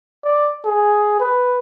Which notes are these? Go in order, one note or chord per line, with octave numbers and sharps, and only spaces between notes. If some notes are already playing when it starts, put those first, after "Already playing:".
D5
G#4
B4